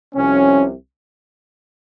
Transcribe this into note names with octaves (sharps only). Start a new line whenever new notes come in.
C2 C3 F3 C#4